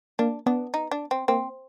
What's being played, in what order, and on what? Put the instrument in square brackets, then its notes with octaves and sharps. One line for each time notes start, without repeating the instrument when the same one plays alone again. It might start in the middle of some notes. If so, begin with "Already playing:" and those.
[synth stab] A#3 [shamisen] D4
[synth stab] B3 [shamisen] D4
[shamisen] D#4
D4
C4
[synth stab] A#3 [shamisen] C4